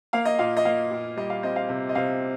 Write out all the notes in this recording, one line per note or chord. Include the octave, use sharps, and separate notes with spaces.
A#3 F5
D#5
A#2 F5
D#5
A#3 F5
A#2
G3 D#5
F5
C4 D#5
F5
C3
D#5
C3 F5